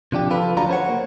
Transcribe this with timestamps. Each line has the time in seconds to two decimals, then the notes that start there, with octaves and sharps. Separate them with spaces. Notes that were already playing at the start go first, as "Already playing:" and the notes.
0.12 C3 F3 D4 G4
0.30 F3 F4 A4 B4
0.57 D2 C#3 F#3 D4 F4 A#5
0.69 C5 C#5 F#5
0.89 A#3